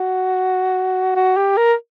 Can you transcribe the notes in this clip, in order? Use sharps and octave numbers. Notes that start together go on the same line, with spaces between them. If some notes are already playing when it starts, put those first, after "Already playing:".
Already playing: F#4
F#4
G4
A#4